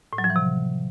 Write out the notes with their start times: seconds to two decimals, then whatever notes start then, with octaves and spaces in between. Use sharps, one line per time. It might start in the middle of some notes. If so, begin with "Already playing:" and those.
0.13 A2
0.18 F#3
0.24 F3
0.30 E3
0.36 C3